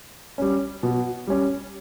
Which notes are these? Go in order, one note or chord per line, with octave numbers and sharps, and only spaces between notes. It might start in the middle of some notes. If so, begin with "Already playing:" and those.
G3 C#4
B2
G3 C#4